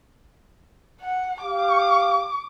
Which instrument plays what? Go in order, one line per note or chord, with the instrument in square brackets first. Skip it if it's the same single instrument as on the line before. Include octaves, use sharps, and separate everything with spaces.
[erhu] F#5
[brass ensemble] G4 F5 [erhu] D6